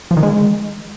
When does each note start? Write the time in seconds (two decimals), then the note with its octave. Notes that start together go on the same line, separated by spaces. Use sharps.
0.11 F3
0.17 D#3
0.23 G#3